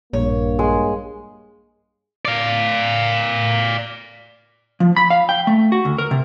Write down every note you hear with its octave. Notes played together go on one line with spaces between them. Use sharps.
A#1 G2 A#3 C#5
G#3
D5 F5
F3
B5
F5
G5
A3
F#4
D2
A#4
C3